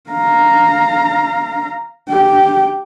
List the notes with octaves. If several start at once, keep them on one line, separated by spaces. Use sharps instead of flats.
F5 A#5
G4